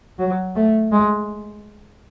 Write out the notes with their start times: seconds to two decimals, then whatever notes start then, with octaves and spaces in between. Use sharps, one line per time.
0.19 F#3
0.56 A3
0.92 G#3